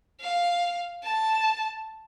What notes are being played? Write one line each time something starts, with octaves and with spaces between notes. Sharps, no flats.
F5
A5